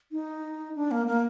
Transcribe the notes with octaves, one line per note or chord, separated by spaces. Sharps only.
D#4
D4
A#3
A#3